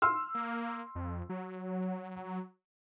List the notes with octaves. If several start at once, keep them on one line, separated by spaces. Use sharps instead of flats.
C6 E6 F6
A#3
F2
F#3